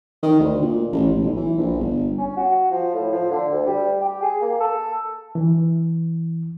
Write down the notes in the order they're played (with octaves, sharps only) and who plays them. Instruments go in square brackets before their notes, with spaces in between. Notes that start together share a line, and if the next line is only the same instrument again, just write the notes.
[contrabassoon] D#3
D2
A#2
A1
A1
B1
E3
A#1
G1
[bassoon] C#4
F#4
F3
A2
F3
D3
D2
G3
G4
G#4
A#3
A4
[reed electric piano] E3